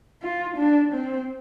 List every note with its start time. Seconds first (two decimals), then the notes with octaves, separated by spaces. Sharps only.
0.22 F4
0.57 D4
0.94 C4